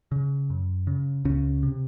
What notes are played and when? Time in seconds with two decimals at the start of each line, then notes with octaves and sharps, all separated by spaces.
0.12 C#3
0.50 F#2
0.87 C#3
1.25 C#2 C#3 C#4
1.63 C3